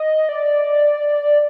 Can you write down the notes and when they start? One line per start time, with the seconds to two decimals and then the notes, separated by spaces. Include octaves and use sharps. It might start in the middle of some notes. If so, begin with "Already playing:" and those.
Already playing: D#5
0.29 D5